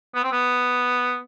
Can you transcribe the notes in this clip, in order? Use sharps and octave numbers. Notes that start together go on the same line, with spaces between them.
B3
C4
B3